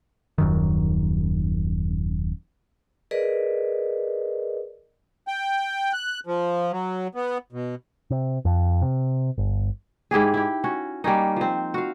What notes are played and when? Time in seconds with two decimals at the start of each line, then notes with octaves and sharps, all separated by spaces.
0.38 D#1 F#2 D#3
3.11 G#4 A#4 B4 D5 D#5
5.28 G5
5.93 F#6
6.27 F3
6.72 F#3
7.15 B3
7.53 B2
8.10 C3
8.45 F2
8.82 C3
9.38 G1
10.11 G#2 E4 G4 G#4
10.34 E4 G4
10.64 C#4 F#4
11.04 G3 A#3 C#4 D#4
11.36 F3 C4
11.74 F#4 F5